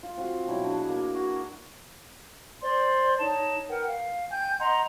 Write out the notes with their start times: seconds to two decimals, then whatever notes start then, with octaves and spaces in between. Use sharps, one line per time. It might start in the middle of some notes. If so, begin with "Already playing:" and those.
0.03 F4
0.17 C4 F4 F#4
0.47 B2 F#3 E4 G5
0.64 D4 F#4 G#4
0.89 A#3
1.15 F#4
2.62 C5 D5 C6
3.19 D#4 C#5 A5
3.69 A#4 B4 F#5 G5
3.87 F5
4.30 G5 G#5 G6
4.60 D#5 F#5 A#5 C6